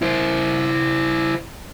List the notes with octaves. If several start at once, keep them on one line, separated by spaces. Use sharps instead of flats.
E4 C5